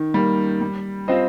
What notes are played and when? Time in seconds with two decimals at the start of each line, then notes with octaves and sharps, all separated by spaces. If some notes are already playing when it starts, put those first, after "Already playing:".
Already playing: D#3
0.14 G3 A#3
0.61 G3
1.08 C4 F4 C5 D#5